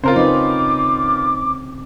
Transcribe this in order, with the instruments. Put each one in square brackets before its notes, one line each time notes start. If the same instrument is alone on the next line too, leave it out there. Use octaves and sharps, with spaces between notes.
[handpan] C#3 C4 C#4 [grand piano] F4 A#4 C5
[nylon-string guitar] D#4 B4 [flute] D6